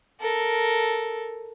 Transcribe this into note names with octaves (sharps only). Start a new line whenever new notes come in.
A4 A#4